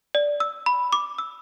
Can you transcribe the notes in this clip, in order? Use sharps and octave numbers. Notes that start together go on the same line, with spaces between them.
D5
E6
B5
D6
E6